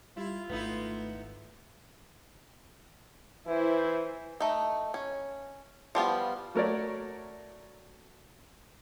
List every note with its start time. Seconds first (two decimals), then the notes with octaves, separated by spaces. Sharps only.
0.17 G3 E4 F4
0.49 D1 G#1 A3 B3 D#4 E4
3.47 E3 E4 C5
4.40 A3 D#4
4.94 C#4
5.95 F3 G3 B3 F4
6.54 F#3 A3 A#4 C#5 D5